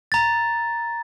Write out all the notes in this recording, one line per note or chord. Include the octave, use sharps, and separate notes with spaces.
A#5 A6